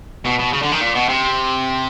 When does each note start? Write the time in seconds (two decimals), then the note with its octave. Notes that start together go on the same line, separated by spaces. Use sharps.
0.25 B2
0.39 B2
0.53 C#3
0.62 D3
0.72 D#3
0.81 A#2
0.95 B2
1.09 C3